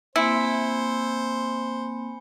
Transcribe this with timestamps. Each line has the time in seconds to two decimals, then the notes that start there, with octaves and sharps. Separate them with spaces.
0.16 A#3 C4 E4 C5 G#5 B5 C6 C#7